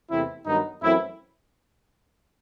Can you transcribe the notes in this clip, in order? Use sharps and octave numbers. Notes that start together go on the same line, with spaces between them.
E2 C3 E3 A3 C4 E4
G2 D#3 F#3 B3 D#4
F#2 E3 A3 C4 E4